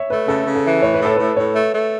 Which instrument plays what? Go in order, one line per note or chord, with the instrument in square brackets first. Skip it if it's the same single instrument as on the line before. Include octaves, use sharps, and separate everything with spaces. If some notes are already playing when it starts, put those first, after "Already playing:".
Already playing: [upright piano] C#5 E5
[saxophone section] A3 [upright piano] B4
[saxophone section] C#3 [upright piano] A4
[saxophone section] C#3
[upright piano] A4
[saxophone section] E3
[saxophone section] A2 [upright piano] C#5
[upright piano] B4
[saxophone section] A2 [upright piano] A4
[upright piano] B4
[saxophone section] A2
[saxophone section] A2 [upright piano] C#5
[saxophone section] A3
A3